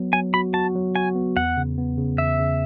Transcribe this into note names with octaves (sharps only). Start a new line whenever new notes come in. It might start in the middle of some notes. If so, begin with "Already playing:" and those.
Already playing: F#3 B3
F#3 G#5
F#4 B5
F#4 A5
F#3
F#4 G#5
B3
E2 F#5
C#3
B3
C#3
E2 E5
C#3